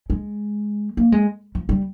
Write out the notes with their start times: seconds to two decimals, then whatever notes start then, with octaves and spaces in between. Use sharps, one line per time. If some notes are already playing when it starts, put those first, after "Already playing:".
0.10 G#3
0.97 A#3
1.12 G#3
1.55 F3
1.69 G3